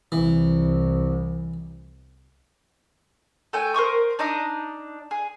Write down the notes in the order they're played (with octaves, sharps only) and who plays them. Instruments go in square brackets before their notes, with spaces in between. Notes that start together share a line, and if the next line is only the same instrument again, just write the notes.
[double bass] C2 [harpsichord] E3
[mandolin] A3 G5 G#5
A#4 C5 C#6 D#6
D4 D#4 A#5 D#6
G#4